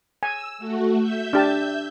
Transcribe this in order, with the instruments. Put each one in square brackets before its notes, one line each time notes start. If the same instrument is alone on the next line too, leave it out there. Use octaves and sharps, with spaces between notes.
[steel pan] G#5 [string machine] E6
[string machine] A3 F#4
E5 G6
[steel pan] D4 G4 A5